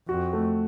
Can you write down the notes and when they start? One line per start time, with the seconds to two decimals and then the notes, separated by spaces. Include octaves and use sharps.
0.08 F2 F#4
0.33 A3